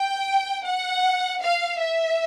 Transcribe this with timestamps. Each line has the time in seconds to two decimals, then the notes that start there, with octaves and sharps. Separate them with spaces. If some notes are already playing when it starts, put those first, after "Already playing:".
Already playing: G5
0.66 F#5
1.42 F5
1.79 E5